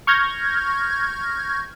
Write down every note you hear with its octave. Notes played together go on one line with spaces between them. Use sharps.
C#6 F6 G6 G#6 A#6